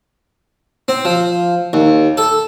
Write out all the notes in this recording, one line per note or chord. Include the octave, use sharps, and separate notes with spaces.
C4
F3
D#2
A4